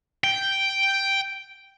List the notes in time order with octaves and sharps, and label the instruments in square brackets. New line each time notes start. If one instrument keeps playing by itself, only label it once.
[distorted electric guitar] G5